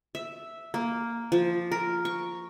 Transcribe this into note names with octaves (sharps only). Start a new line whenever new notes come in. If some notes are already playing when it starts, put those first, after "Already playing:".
E5
A#3
F3
A#4
C#6